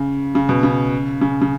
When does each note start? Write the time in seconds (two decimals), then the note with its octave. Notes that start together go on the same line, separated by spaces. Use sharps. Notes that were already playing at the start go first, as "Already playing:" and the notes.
Already playing: C#3
0.35 C#3
0.49 B2
0.63 C#3
1.21 C#3
1.42 C#3